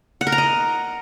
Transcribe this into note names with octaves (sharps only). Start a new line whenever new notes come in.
F#5
A#4
A#5
D#5